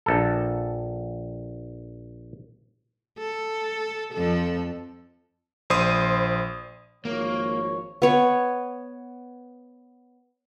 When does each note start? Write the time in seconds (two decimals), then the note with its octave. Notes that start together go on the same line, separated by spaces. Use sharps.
0.06 A#1 A4
3.18 A4
4.13 F2 F3 A4
5.70 A#1 C5 C6 D#6 D#7
7.05 G#1 F3 A#3 C#5
8.02 B3 C#5